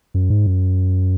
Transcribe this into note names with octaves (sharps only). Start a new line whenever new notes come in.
F#2
G#2
F#2